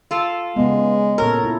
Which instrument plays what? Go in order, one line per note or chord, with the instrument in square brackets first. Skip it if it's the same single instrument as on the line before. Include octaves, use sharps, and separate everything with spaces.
[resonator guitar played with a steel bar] F4 A4
[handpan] C#3 B3 [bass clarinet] G#3
[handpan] A#2 A4 C#5 [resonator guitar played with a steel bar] A#4
[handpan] E4